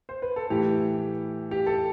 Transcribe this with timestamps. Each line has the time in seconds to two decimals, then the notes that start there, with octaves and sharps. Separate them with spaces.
0.09 C5
0.22 B4
0.36 A4
0.50 A2 E3 A3 G4
1.51 G4
1.66 A4